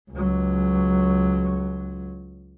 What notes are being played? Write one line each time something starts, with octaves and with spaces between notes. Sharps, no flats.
C#2 F#3